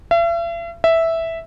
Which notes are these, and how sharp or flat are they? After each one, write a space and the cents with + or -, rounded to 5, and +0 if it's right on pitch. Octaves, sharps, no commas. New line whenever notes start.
E5 +45
E5 -5